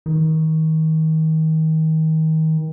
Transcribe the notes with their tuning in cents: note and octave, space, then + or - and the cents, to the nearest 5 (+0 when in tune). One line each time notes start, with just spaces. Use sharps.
D#3 +30